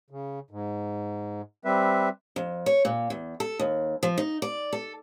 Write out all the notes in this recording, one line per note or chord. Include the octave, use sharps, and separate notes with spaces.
C#3
G#2
G3 C4 B4 E5
F2
C#5
A#2
E2
A4
D#2
F3
D#4
D5
A4